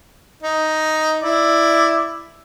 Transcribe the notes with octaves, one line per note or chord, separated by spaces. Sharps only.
D#4
E4 D5